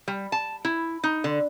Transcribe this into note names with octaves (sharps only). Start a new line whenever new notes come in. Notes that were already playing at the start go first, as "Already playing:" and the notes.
G3
A5
E4
D#4
D3